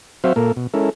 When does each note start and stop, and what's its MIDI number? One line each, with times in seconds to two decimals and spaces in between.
0.24 0.33 54
0.24 0.33 60
0.24 0.33 66
0.24 0.33 72
0.24 0.33 76
0.24 0.33 77
0.36 0.52 46
0.36 0.52 58
0.36 0.52 69
0.36 0.52 70
0.57 0.67 47
0.74 0.90 56
0.74 0.90 61
0.74 0.90 64
0.74 0.90 69
0.74 0.90 70